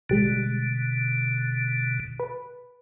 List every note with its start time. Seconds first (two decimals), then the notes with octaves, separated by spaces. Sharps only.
0.09 A1 B2 D3 G3 G#3
2.20 B4